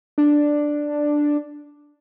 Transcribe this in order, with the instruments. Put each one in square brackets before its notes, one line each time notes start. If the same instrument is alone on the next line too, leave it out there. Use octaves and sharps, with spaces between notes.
[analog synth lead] D4